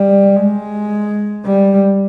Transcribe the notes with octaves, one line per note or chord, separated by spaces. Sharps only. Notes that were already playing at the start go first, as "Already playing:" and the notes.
Already playing: G3
G#3
G3